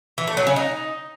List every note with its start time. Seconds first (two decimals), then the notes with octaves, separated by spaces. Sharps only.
0.18 E3
0.27 A3
0.37 F#3
0.47 C#3
0.56 D#4